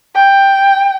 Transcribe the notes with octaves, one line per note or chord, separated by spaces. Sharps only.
G5